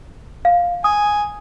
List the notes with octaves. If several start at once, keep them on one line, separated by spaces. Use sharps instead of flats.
F5
G#5 D#6